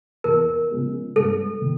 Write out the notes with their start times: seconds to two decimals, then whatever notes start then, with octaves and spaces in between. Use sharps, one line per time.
0.24 E2 A#4
0.70 C#3 F3 G#3 B3
1.16 G2 A4
1.62 D#3